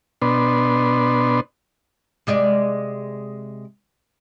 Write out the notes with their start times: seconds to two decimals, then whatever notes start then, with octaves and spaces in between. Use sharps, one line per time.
0.22 B2 B3 D4 C6
2.27 C3 G#3 D5